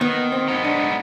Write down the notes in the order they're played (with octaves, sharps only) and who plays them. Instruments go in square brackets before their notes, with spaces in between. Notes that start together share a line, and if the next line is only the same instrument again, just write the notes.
[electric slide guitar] D#3 [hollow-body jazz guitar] B3
[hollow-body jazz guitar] C4
[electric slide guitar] G#3 B3 D#4
[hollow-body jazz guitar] D4